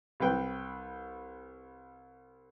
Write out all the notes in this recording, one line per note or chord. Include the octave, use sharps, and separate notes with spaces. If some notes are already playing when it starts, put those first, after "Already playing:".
C2 B4 G5